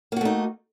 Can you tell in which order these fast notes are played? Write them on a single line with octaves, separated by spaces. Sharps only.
A#3 F#4 A3 D#4